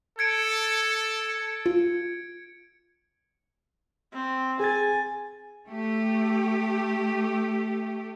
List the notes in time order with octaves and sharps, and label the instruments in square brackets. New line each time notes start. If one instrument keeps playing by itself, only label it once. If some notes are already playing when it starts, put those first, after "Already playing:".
[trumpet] A4 [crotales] G#6 C#7 D7
[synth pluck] F4
[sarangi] C4
[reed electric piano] G#4 A6 [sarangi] G#5
[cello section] A3 G4